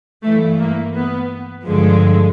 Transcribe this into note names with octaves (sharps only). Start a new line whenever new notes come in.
G2 E3 A3
A#3
B3
G2 D3 F3 G#3